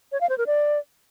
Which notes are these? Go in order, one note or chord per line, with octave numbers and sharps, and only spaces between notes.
C#5
F5
C5
A#4
D5